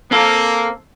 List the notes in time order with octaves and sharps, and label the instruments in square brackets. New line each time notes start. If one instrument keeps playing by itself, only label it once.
[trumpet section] A#3 [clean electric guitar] C4 A4